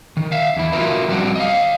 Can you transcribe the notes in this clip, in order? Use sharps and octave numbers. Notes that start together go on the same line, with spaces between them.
D#3
E5 F5
E2 E4
F4 F#4 A#4 B4 E5
F3 G3 C4 F#4 D5
D#5 F5